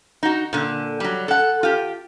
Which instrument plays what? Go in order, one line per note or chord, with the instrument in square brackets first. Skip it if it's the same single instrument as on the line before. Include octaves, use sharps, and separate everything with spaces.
[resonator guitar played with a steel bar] D#4 F#4
A#2 D3
F#3 G3
A4 F#5
F4 G4